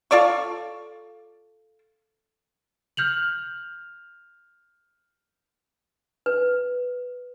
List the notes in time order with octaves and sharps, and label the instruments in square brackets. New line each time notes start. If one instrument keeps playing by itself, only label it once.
[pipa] F4 A4 D5 C#6
[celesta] F6 G6 F7 F#7
[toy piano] B4